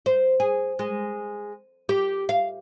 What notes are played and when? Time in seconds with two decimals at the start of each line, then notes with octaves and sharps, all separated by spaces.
0.06 C5
0.40 G#4
0.79 G#3
1.89 G4
2.29 F5